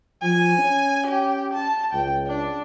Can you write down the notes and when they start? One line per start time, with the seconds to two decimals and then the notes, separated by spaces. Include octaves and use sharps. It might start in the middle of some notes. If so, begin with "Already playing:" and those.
0.23 F3 G#5
0.58 C#4
1.07 G4
1.54 A5
1.93 C#2 G5
2.27 D4